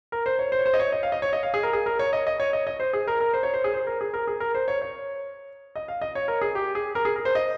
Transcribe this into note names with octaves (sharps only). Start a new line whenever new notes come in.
A#4
C5
C#5
C5
C#5
C5
D#5
C#5
D#5
F5
D#5
C#5
D#5
F5
G#4
A#4
G#4
A#4
C#5
D#5
D#5
C#5
D#5
D#5
C5
G#4
A#4
A#4
C5
C#5
C5
G#4
C5
A#4
G#4
A#4
G#4
A#4
C5
C#5
C#5
D#5
F5
D#5
C#5
A#4
G#4
G4
G#4
A#4
G#4
A#4
C5
D#5